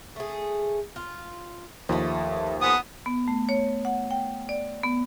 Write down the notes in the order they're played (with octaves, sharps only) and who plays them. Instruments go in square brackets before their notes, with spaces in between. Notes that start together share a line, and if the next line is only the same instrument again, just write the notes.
[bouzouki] A3 G#4
F4
[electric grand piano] D#2 F3 [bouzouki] A3 E4 D#5
[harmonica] B3 D#6 [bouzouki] A4 C5 G#5
[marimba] B3
A3
C#5
F#5
G5
D5
B3